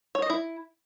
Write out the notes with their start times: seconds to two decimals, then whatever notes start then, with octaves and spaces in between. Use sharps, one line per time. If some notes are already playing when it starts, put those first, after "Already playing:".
0.15 C#5
0.22 D#5
0.30 E4